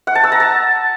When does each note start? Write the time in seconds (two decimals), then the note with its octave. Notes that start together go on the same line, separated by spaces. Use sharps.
0.07 F#5
0.15 A5
0.24 E6
0.32 A#5
0.40 A5